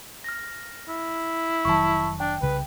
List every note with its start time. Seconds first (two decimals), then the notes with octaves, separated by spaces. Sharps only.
0.24 F6 A#6
0.89 E4
1.65 F1 D#3 F#3 A5 C#6
2.20 D4 G5
2.42 C2 C#3 B4